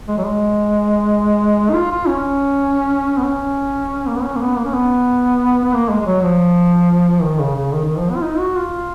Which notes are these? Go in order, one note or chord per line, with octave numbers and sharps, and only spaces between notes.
G#3
F#3
G#3
D#4
F4
F4
C#4
B3
C#4
A#3
B3
C#4
A#3
B3
A#3
C#4
B3
B3
A#3
G#3
G#3
F#3
F3
D#3
C#3
C#3
D#3
D#3
F3
B3
F4
D#4
F#4
F4